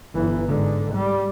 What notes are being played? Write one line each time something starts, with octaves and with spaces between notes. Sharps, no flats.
G1 E3
G#2 D3
G3